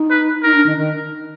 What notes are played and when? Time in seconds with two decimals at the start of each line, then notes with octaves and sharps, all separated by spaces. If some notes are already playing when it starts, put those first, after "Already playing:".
Already playing: D#4
0.10 B4
0.43 D#4 A#4
0.55 D4
0.66 D#3
0.77 D#3